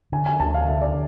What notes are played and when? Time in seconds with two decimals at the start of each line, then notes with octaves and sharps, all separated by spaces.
0.12 D3 G#5
0.26 G#5
0.40 D2 A5
0.54 F5
0.68 D3 E5
0.81 D5